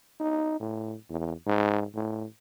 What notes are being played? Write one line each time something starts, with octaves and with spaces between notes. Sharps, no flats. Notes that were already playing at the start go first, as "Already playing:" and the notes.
D#4
A2
E2
G#2
A2